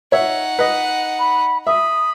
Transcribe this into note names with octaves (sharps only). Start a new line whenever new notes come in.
D#4 C#5 E5 F#5
B4 D#5
B5
E5 B5 D#6